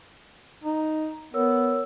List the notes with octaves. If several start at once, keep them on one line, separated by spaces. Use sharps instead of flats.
D#4
B3 A#4 C#5 E6